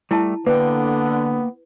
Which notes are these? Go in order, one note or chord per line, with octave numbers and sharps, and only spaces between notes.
G3 A3 E4 A5
D3 A#3 B3 B4 G5